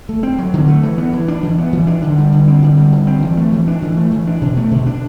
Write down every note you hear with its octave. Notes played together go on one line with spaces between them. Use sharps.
A3
C4
F#3
D3
A3
E3
B3
E3
D4
E3
B3
E3
D4
D3
G3
D3
C4
D3
G3
D3
C4
E3
A3
E3
D4
E3
A3
E3
D4
B2
A3
B2
D4